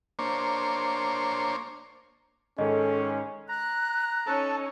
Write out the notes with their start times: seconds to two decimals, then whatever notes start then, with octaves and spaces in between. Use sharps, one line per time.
0.19 A#3 D4 C5 C#5
2.58 G#2 D#3 G#3 C#4 A4 D#5
3.49 A#5 F#6
4.26 C#4 D#4 A4 C#5 A5